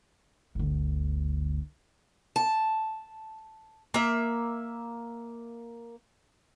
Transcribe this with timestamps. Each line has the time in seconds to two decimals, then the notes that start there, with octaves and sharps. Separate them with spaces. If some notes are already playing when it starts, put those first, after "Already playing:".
0.55 G1 D2
2.36 A5
3.94 A#3 E5